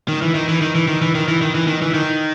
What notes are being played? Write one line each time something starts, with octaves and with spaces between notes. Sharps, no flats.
D#3
E3
D#3
E3
D#3
E3
D#3
E3
D#3
E3
D#3
E3
D#3
E3
D#3